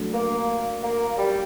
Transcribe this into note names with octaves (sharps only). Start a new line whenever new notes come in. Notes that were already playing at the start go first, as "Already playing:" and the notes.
Already playing: F#3 A3 D4
A#3
A#3
G3